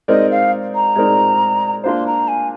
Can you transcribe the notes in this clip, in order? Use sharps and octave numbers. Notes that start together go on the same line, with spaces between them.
G#3 C4 D#4 A#4 D5 D#5
F5
A#5
G#3 C4 D#4 A#4 D5
A#3 D4 F4 C5 C6
A#5
G#5